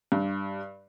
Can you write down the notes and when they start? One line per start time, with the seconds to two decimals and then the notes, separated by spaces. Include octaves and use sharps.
0.12 G2